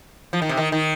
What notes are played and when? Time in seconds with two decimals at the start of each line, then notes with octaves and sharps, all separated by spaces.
0.33 F3
0.42 D#3
0.49 C3
0.57 D#3
0.72 D#3